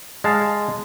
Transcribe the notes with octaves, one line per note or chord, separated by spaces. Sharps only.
G#3 F5 A5